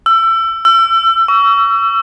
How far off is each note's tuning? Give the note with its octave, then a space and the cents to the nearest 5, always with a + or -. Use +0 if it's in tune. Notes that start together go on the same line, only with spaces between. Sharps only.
E6 +25
E6 +35
C#6 +35